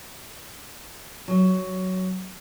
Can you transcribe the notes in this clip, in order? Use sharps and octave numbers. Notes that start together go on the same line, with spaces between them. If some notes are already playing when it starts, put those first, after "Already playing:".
F#3